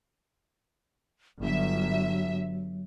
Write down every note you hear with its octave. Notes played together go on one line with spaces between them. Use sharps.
G1 F#3 E5